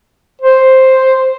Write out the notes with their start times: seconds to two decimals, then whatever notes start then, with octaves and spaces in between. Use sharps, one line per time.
0.42 C5